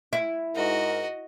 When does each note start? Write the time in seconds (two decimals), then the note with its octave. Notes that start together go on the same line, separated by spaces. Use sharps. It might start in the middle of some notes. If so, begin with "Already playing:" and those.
0.13 E4
0.55 G#2 F#4 A#4 D#5